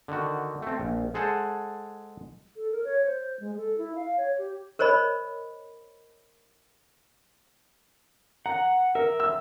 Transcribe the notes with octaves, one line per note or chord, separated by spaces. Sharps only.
D3 D#3 F#4
A3 C4
A#1
G#3 G#4 A4 C5 F#5 A5
A4
A#4
C#5
C5
G#3
A4
E4
F5
C#5
G4
A#4 C5 C#5 D#5 B5
F#5 A#5
A#4 E5
E6